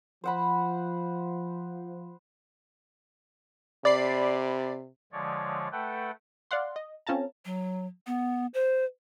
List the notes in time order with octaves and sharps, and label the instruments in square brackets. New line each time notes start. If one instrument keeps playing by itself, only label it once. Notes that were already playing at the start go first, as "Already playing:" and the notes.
[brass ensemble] F3 [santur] C5 F#5 B5
[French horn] C3 [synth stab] D5 B5 C7
[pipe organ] D3 F3 G#3 C#5 D5
A3 A4 B4 F#5 G5
[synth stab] D5 F5 F#5 C6
D#5
C4 C#4 F4 A4 A5 A#5
[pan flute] F#3
B3
C5